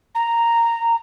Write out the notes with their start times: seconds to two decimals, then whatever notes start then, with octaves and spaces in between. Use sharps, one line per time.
0.15 A#5